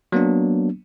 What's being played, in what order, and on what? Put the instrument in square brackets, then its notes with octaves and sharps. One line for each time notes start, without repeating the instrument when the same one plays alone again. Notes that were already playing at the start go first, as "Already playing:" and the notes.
[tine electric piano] F#3 A#3 B3 D4